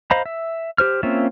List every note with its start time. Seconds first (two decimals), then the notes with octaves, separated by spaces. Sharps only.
0.11 C5 D#5 F5 A#5 B5
0.26 E5
0.78 G4 C5 F6
1.03 A#3 C4 C#4 F4 E5